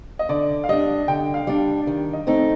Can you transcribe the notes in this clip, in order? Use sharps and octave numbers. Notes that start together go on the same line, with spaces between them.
D#5
D3 D5
F5
G3 D4 D#5
D3 G5
F5
G3 D4
D#3
D#5
A3 C4 D#4